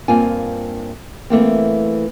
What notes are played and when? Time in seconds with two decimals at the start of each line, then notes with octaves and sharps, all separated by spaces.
0.08 G2 A#3 C4 F4 G#5
1.30 E3 A3 A#3 C4